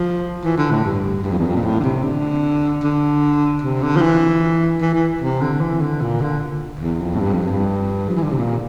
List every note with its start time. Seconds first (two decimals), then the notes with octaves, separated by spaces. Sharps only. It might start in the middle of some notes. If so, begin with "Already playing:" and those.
Already playing: F3
0.44 E3
0.57 D3
0.71 A2
0.84 G2
1.23 G2
1.32 F2
1.39 E2
1.47 F2
1.55 A#2
1.64 A2
1.79 D3
1.83 C3
2.03 D3
2.83 D3
3.62 C3
3.82 D3
3.96 F3
4.01 E3
4.81 E3
4.94 E3
5.21 C3
5.41 D3
5.60 E3
5.81 D3
6.01 A#2
6.21 D3
6.80 E2
7.01 F2
7.15 A2
7.21 G2
7.33 F2
7.46 G2
8.09 F3
8.16 E3
8.23 D3
8.31 C3
8.39 A#2